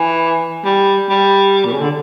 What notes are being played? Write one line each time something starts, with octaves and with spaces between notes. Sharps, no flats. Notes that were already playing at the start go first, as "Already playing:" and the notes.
Already playing: E3
G3
G3
A#2
C#3
D3